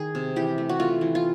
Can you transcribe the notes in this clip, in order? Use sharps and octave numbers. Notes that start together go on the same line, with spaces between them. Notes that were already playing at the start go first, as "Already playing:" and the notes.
Already playing: D#3 G#4
C3
E3 G4
A3
F#4
A3 F4
E3
F4